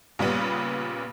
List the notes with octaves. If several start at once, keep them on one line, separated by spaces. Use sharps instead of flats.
A#2 C#3 G3 B3